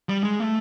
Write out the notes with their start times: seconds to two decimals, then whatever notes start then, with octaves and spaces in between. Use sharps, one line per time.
0.09 G3
0.23 G#3
0.40 A3